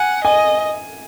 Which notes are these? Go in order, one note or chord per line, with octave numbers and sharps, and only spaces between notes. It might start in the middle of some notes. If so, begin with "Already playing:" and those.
Already playing: F#5 G#5
D#5 G#5